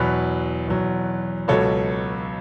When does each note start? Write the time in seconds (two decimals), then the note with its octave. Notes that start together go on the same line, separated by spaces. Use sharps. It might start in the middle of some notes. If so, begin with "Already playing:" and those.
Already playing: E2 B2 F#3 B4
0.68 E2 B2 F#3
1.48 C#2 B2 F#3 A4 C#5